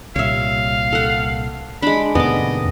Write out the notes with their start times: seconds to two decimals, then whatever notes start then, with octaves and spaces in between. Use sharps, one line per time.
0.16 C2 A#2 G3 C#5 E5 F5
0.92 A4 F#5
1.82 G#3 D4 B5
2.15 F2 A2 C3 D#3 B3 D#5 D6